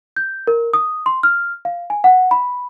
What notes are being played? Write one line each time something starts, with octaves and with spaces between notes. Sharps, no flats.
G6
A#4
D#6
C6
F6
F5
G#5
F#5
B5